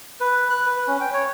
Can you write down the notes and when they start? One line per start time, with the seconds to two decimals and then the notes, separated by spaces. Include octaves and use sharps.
0.21 B4
0.50 F#6
0.66 B4
0.88 C#4
1.01 G5
1.13 C#5